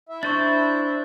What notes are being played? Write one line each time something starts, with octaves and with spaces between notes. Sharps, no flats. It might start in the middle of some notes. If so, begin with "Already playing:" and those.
E4 E5
D4 C5 C#6 A6